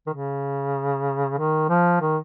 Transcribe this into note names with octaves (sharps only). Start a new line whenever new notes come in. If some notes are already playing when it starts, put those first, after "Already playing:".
D#3
C#3
D#3
F3
D#3